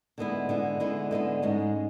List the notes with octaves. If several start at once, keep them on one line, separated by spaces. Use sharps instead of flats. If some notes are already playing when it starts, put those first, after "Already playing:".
D3 G#3 B3 E4
D3 G#3 B3 E4
D3 G#3 B3 E4
D3 G#3 B3 E4
G#2 G#3 C#4